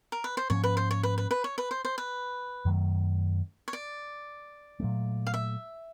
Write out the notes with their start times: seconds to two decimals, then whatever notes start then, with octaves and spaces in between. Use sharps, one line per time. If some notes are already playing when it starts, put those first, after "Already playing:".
0.12 A#4
0.24 B4
0.37 C5
0.50 G#2 F3 A#3 C#4 C#5
0.64 B4
0.77 C5
0.91 C#5
1.03 B4
1.18 B4
1.31 B4
1.44 C#5
1.58 B4
1.71 C5
1.85 C5
1.98 B4
2.65 F#2 D#3 F#3 A3
3.68 C#5
3.73 D5
4.80 A#2 F#3 A3
5.27 F5
5.34 E5